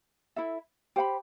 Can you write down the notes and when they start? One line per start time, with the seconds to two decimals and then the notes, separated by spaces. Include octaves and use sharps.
0.36 E4 A4 E5
0.96 G4 C5 F#5 B5